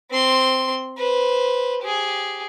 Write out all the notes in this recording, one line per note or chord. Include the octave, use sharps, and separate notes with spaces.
C4 C6
B4 C5
G4 G#4